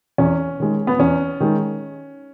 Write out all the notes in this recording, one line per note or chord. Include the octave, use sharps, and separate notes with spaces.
E2 C#4
D#3 G#3
B3
E2 C#4
D#3 G#3